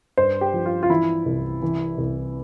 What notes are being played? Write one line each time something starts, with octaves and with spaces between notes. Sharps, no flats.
G2 C5
G4
F3
F4
F4
E3 E4
C2
E3
C2